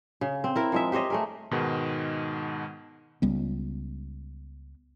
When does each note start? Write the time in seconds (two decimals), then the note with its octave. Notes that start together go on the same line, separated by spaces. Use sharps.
0.21 C#3
0.44 C4
0.56 E4 A#4
0.72 F3 G#3 E5
0.92 G4 C5 C#5 D#5
1.10 A3 G#4 A#4
1.51 G#2 B2 D#3 G#3
3.22 C#2 G3 B3